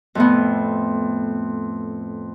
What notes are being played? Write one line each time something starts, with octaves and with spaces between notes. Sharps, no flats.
F2 A2 B3